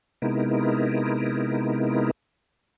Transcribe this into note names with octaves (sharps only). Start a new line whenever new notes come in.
C3 G#3 B3 D#4 E4 A#4